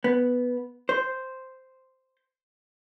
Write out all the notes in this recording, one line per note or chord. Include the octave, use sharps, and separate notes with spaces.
B3
C5